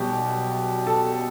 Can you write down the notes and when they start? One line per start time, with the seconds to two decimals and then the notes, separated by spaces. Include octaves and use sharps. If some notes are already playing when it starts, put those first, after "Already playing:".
Already playing: B1 B2 G3 G4
0.87 A4 A5